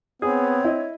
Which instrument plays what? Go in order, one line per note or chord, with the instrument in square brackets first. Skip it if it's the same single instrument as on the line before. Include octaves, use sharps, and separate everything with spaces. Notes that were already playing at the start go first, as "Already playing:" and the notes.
[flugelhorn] B3 [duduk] C4 [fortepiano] G#4 [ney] C#5
[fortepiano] E4 D#5